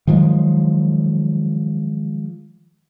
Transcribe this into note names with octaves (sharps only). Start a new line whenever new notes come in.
D#3 F3 F#3 G#3